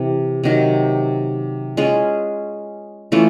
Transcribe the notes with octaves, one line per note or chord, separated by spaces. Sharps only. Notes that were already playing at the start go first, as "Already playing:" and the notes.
Already playing: C3 E3
C3 D#3 F#3
G#3 C#4 F4 G#4
E3 A3 C#4 F4